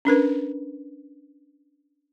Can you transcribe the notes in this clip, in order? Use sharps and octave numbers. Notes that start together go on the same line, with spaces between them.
C#4 D4 A#4 B4